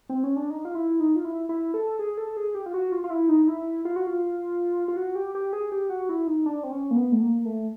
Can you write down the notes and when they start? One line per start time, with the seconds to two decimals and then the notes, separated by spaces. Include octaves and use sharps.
0.09 C4
0.24 C#4
0.36 D4
0.50 D#4
0.65 F4
0.75 E4
1.00 D#4
1.16 F4
1.25 E4
1.49 E4
1.74 A4
1.99 G#4
2.18 A4
2.37 G#4
2.55 G4
2.66 F4
2.74 F#4
2.92 F4
3.04 F4
3.10 E4
3.29 D#4
3.48 E4
3.85 F4
3.96 F#4
4.07 F4
4.88 F4
4.96 F#4
5.15 G4
5.35 G4
5.53 G#4
5.72 G4
5.90 F#4
6.09 E4
6.27 D#4
6.46 D4
6.63 C4
6.72 C#4
6.91 A#3
6.96 B3
7.12 A3
7.21 A#3
7.45 A3